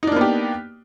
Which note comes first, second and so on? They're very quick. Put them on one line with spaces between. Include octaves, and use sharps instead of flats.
D#4 D4 A#3 B3 G4